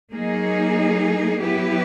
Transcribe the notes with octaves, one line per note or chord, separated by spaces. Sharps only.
F#3 A#3 D#4 G#4
F#3 B3 E4 G4 B4